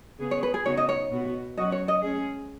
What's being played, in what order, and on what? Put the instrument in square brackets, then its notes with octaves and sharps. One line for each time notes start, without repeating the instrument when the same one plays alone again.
[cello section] C#3 B3 G#4
[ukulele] C#5
B4
G#4
[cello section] C#3 B3 D#4 F#4 [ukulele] C#5
[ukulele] D#5
C#5
[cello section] B2 B3 F#4
[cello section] F#3 C#4 F#4 [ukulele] D#5
[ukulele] C#5
D#5
[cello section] G#3 C#4 G#4